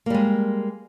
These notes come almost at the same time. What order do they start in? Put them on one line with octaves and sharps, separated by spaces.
A#3 G3 G#3